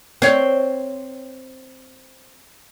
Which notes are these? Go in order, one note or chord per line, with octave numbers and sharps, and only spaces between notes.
C4 C#5